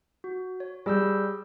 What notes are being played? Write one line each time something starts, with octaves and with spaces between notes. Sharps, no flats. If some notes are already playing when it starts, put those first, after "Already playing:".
F#4
C#5
G3 G#4 E6 G6